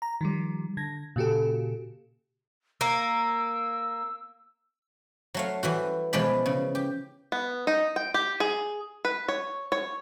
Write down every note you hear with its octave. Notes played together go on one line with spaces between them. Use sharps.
A#5
D#3 F3 G3
D3 G#6 A#6
A#2 C#3 F#4 G4 A4
A#3 E6
F#3 A3 F5
E3 G3 F#4
B2 E3 F3 G#3 D5 B5
C#3
G4
B3
D#4
G5
G4
G#4
B4
C#5
C#5